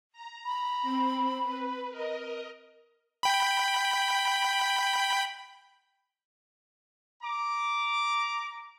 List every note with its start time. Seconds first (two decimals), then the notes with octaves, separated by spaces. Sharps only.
0.13 A#5
0.46 B5
0.82 C4
1.44 B4
1.90 A#4 D#5
3.23 G5 B5
7.23 A#5 D6